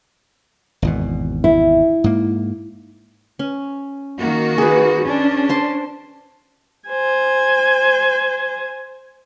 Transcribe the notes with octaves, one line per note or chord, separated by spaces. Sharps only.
G#1 E2 B2
E4
G#2 A#3
C#4
D#3 A#3 F#4
G#4 B4
C#4 D4
C5 A5 C6
C5 G#5